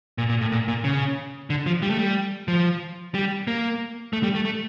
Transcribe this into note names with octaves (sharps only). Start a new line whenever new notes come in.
A#2
A#2
A2
A#2
A#2
C#3
D3
F3
G3
A3
G3
F3
G3
A#3
A3
G3
A3
A3